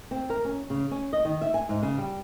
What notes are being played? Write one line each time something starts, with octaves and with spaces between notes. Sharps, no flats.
C4
A#4
C#4
C#3
C#4
D#5
D#3
E5
G#5
G#2
C#3
G3